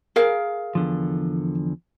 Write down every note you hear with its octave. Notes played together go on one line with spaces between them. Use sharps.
G#4 A#4 F5
E2 D3 F3